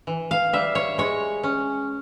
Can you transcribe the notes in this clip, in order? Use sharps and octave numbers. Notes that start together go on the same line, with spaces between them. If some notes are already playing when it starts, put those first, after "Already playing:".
E3
F5
G3 E5
C#5
G#3 C#5
C#4